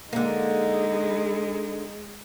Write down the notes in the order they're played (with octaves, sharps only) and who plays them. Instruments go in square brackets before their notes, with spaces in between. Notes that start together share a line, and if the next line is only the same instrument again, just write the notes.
[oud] D3 A#3 [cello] G#3 G#4 [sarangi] D#4